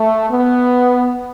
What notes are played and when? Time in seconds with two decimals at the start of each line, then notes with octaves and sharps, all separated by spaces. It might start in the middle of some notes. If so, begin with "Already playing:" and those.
Already playing: A3
0.31 B3